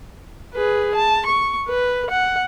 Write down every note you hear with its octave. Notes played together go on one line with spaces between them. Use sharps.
G#4 B4
A5
C#6
B4
F#5